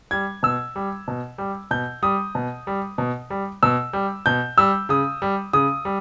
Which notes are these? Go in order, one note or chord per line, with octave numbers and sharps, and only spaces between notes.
G3 G#6
B2 E6
G3
B2
G3
B2 G6
G3 D#6
B2
G3
B2
G3
B2 E6
G3
B2 G6
G3 E6
C#3 D#6
G3
C#3 D#6
G3